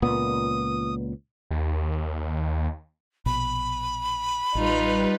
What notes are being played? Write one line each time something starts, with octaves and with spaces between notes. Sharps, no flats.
C#2 A#2 B3 D#6
D#2
A#1 B2 B5
A1 G3 D#4 F4 B4